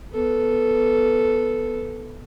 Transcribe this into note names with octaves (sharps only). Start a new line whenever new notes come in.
B3 A4